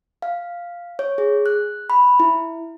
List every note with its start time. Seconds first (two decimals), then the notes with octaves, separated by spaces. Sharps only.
0.22 F5
0.99 C#5
1.18 G#4
1.46 F#6
1.90 B5
2.20 E4